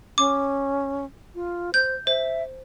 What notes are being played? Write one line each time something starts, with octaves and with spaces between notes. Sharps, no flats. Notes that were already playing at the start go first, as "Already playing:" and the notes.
C#4 D6
F4
C5 G6
C5 E5